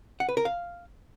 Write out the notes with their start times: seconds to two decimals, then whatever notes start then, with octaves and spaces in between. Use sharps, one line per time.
0.20 F#5
0.29 B4
0.37 A#4
0.45 F5